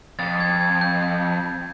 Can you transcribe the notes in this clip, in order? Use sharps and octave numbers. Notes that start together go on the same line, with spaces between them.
F2 A6
G#6
G#6
G6
G6